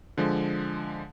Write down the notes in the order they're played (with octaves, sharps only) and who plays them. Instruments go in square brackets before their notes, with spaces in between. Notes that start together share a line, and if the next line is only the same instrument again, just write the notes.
[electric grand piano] D3 F3 G#3